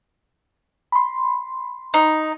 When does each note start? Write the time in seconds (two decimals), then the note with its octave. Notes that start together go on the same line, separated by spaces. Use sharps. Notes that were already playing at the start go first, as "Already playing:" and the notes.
0.92 B5 C6
1.94 D#4